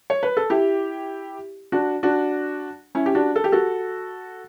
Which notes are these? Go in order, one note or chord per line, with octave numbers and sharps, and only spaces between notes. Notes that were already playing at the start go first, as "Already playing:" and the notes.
C#5
B4
A4
E4 G4
D4 F#4
D4 F#4
C#4 E4
G4
D4 F#4
A4
G4
F#4 A4